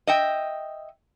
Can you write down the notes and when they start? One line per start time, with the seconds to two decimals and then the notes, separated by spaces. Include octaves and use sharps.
0.07 D#5 E5 G5